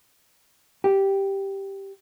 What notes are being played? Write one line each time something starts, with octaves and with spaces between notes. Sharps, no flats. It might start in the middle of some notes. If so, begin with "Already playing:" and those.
G4